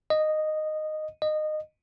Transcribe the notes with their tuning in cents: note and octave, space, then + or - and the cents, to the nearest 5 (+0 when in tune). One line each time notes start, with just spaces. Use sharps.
D#5 -10
D#5 -20